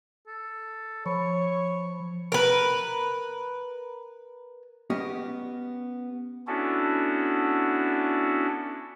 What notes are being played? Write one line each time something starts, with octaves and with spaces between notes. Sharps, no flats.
A4
F3 C#5 B5 C#6
A#4 B4
B3 C#4 G4 D#5
B3 C#4 D4 E4 F#4 A4